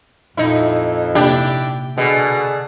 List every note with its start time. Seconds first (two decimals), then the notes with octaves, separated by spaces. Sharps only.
0.37 F2 A#2 D#4 E4
1.15 C3 A#3 D4 E4 G4 B5
1.98 B2 D3 D4 G#4